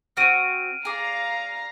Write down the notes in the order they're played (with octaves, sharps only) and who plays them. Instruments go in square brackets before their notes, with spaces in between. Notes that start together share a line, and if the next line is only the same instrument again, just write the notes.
[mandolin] C4 F#4 [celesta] F6 D7 D#7
[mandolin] G#4 D5 [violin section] F5 A#5